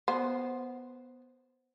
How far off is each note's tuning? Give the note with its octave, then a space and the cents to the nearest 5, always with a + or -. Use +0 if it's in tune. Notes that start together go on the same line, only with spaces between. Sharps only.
B3 +0 C5 +0